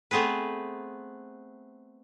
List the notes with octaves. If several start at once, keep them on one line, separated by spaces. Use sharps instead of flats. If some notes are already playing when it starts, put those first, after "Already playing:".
A3 B3 C4 G#4 B4